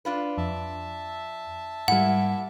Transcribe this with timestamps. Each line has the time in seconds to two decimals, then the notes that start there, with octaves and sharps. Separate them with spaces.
0.05 D4 F4 B4
0.38 F2 E5 A5
1.88 G#2 G3 A#3 E4 F#5